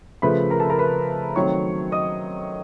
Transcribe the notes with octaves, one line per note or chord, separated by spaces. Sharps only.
C#3 F3 A3 B4 B5
A#4 A#5
A4 A5
A#4 A#5
B4 B5
D#3 F#3 A3 C4 C#5 C#6
D#5 D#6